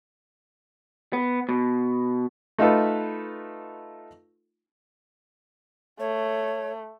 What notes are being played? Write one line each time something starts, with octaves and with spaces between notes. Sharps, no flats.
B3
B2
A3 D#4 F4 A4 B4
A3 C#5